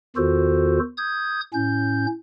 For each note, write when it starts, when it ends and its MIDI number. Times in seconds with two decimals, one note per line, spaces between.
0.17 0.79 40
0.17 0.79 51
0.17 0.79 65
0.17 0.79 66
0.17 0.79 69
0.17 0.79 72
0.97 1.41 87
0.97 1.41 91
0.97 1.41 92
1.53 2.06 45
1.53 2.06 61
1.53 2.06 91